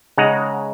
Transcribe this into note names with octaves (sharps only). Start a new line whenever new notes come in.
C#3 G#3 D#4 F#5 A#5